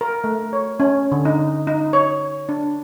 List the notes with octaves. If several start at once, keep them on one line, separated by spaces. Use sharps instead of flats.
A#4
A3
C#5
C#4
D3
D#4
D#4
C#5
D4